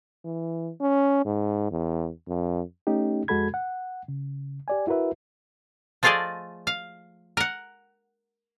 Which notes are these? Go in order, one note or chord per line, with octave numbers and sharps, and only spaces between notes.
E3
C#4
G#2
E2
F2
A3 C#4 D#4 G4
F2 G#3 F#4 A4 B5 G#6
F#5
C#3
G4 D5 G#5
E4 F#4 A#4 B4 E5
F3 A3 F4 G#4 D5 D#5
F5
A#4 F#5